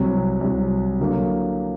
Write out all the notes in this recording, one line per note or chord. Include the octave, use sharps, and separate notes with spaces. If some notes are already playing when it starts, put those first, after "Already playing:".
Already playing: C2 C3 F#3
C2 C3 F#3
D3 F#3 A#3